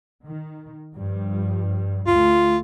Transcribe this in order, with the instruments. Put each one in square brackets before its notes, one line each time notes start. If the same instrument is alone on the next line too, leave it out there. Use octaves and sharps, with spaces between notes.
[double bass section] D#3
G2 F3 G3
[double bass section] D2 A3 [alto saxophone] F4